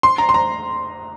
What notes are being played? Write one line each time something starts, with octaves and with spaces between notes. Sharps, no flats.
C6
A#5
C6
A#5